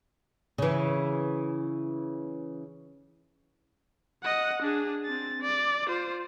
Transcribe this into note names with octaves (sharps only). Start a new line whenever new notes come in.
C#3 E3
D#5 F#5
D4 G#4
C4 A6
D5
F4 C5